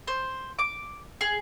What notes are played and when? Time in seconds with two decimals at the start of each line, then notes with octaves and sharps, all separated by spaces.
0.07 C5
0.59 D6
1.21 G#4